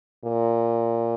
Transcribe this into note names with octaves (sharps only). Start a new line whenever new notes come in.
A#2